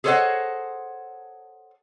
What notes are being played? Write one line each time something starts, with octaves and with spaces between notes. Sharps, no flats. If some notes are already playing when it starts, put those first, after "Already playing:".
G#4 A4 C5 C#5 D#5 F#5